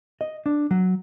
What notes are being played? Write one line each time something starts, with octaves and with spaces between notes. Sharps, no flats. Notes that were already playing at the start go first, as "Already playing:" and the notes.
D#5
D4
F#3